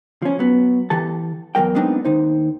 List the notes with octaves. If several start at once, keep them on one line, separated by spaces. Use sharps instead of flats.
F3 C#4
F#3 B3
E3 G4 A4 A5
E2 G2 F#3 A#4 G5
G#3 B3 C4 D4 D#4
D#2 D#4 C5